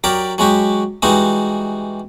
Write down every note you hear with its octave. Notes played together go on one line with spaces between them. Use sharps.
F#3 G4 A#4 D5
F#3 G#3 F#4 G4
E3 G3 G#3 D#4 F#4